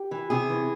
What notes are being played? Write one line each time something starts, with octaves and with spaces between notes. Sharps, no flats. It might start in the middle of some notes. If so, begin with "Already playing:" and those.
Already playing: G4
E3
C3 G#4
E3